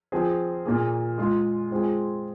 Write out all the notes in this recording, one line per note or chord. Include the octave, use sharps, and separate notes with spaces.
F3 C4 G#4
A#2 A#3 G#4
G#3 F4 G#4
G#3 C4 F4 G#4